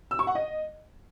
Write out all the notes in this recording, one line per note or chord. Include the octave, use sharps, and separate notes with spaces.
E6
C#6
F#5
D#5